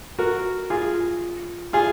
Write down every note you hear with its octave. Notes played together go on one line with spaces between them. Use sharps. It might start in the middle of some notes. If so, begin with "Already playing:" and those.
F#4 A#4
F4 G#4
F4 G#4